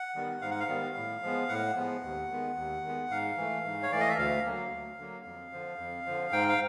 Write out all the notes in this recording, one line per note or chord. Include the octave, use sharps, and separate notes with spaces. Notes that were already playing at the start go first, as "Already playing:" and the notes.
Already playing: F#5
D#3 G3 B3
G#2 F5
F#5
F5
D#3 G3 B3
A2
F3 G#3 B3
A2 F#5
F3 G#3 B3
D#2
D#3 G#3 B3
D#2
D#3 G#3 B3
G#2 F5
E3 A3
G#2
C#5
E3 A3 D5
D#5
E5
D2 F5
D3 F#3 A#3
D2
D3 F#3 A#3
F2
D3 F3
F2
D3 F3
G#2 G5
F5